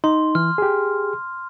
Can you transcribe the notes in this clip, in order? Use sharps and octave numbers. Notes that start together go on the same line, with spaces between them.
D#4 C6
E3 F6
G4 G#4